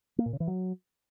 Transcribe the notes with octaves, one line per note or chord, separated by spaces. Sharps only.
A#3
A#2
C#3
E3
F#3